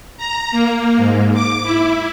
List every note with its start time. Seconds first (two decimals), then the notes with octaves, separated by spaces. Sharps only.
0.17 A#5
0.51 A#3
0.97 G#2
1.34 D6
1.63 E4